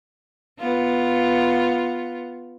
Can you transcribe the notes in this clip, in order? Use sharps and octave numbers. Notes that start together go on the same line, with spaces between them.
B3 F4